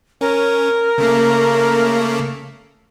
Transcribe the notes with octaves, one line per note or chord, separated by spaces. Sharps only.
C#4 A#4
C#3 A3 A#3